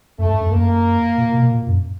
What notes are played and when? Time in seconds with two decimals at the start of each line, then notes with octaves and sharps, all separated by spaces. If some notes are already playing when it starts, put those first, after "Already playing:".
0.19 F#2 A3
0.30 G2
0.40 F#2
0.51 F#2 A#3
1.17 A#2
1.34 B2
1.51 A#2
1.67 F#2